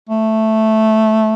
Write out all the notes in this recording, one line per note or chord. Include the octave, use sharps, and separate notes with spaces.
A3